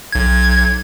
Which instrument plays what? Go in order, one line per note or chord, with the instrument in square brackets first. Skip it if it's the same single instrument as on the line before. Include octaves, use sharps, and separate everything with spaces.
[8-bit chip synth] B1 G#6